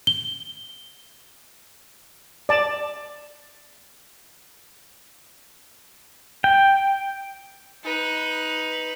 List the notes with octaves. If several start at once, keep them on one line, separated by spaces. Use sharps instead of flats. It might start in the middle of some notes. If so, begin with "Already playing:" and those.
G7
D5 A5
G5
D#4 B4